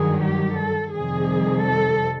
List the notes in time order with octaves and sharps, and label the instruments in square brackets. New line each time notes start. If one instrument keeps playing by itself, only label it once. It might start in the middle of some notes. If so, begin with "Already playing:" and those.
Already playing: [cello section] G2 D#3 F#3 G#4
G4
A4
F2 C3 D#3 G3 G#4
A4